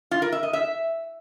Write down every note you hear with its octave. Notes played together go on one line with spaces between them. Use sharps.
F4
A#4
E5
D#5
E5